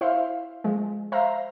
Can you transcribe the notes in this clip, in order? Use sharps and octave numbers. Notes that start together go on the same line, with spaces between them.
E4 C5 E5 F5
F3 G#3
C5 E5 F5 A#5